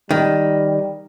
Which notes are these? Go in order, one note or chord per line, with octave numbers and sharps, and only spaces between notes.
D#3 G3